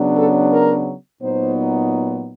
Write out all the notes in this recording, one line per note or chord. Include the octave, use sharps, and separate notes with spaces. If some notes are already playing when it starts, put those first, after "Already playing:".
Already playing: C#3 F#3 B3 D4
A4
A#4
A#2 F#3 B3 D#4 C5